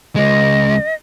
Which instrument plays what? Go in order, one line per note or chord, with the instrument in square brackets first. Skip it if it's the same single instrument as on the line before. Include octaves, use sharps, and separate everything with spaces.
[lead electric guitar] C#2 G#3 [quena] D#5